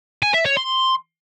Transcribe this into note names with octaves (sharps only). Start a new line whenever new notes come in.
G#5
E5
C#5
C6